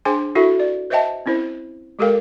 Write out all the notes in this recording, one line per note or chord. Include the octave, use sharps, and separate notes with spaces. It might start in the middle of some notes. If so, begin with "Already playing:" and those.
D4 G#4 C5 G5 G#5 C6
E4 F#4 A4 E5
D5
B4 C5 D#5 E5 G5 A5
C4 C#4 E4 C5
G#3 G4 A4 A#4 F5 G5